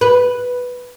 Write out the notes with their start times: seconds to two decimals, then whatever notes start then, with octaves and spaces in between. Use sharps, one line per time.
0.01 B4